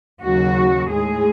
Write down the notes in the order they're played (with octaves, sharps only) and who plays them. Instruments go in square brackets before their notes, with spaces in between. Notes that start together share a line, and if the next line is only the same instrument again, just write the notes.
[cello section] D#2 C#3 F#3 F#4
A2 G#3 G#4